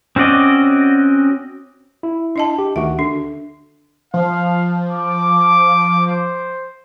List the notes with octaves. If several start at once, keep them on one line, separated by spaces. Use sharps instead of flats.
C4 C#4 F#4 D5 D#5
E4
D4 D#5 A5
G4
D2 D#3 F#4 E5
D3 D4
F3 F5
D6
C5